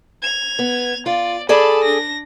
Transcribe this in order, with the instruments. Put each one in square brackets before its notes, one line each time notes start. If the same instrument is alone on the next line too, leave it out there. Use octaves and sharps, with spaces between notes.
[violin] G#6 F7
[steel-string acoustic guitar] B3
[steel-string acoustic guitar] F4 [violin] D5
[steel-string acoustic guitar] G#4 A4 D5 [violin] A5 B5
[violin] D4 A#6